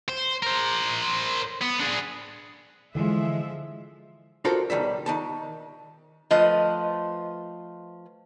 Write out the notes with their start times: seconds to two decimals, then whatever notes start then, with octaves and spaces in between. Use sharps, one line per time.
0.09 C5
0.42 A#4 C5
1.62 B3
1.80 D4 G#4
2.95 D3 E3 F3 G#3 E5
4.45 D4 F4 F#4 A4 A#4 C5
4.70 B1 D#3 G3 E5
5.06 D#3 D#4 A5
6.31 F3 A3 B4 D#5